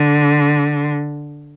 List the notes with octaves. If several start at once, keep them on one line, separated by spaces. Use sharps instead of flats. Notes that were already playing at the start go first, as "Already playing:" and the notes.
Already playing: D3